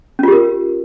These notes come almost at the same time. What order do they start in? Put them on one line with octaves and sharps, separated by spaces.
C#4 F4 G4 A#4